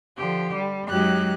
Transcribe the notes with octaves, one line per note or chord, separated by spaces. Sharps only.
D3 F3 G4
G3
F#2 F#3 G#3 D#4 G4 F#6